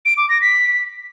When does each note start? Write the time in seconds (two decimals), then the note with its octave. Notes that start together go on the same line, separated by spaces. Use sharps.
0.05 D7
0.17 D6
0.29 A#6
0.41 B6